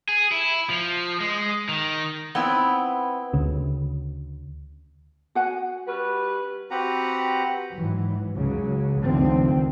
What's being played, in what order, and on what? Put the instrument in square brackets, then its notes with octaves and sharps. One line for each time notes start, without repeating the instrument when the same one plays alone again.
[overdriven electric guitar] G#4
E4
F3
G#3
D#3
[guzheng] B3 C4 E4
[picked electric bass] D2 C#3
[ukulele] F#4 F#5 G#5
[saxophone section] G3 C#4 B4
[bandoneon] C4 F#4 G4 B4 F#5 A#5
[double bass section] G#2 E3 F#3
C#2 C#3 F#3
C#2 D3 D#3 F3 A3 C4